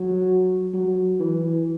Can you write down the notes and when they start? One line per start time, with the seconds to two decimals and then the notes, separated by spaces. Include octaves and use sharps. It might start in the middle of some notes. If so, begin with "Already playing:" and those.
Already playing: F#3
0.74 F#3
1.20 E3